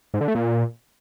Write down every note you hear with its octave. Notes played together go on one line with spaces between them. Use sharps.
G#2
D3
A3
A#2